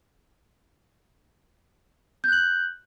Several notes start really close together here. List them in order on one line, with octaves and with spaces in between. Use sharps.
G6 F#6 F#7